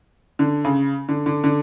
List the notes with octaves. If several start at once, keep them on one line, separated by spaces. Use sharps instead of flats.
D3
C#3
D3
D3
D3